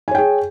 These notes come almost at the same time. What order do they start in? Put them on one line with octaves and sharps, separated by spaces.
G#5 C#5 G5 G#4